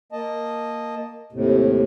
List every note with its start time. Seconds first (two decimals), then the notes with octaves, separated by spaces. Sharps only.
0.12 A#3 D#5 A5
1.33 D#2 A2 C3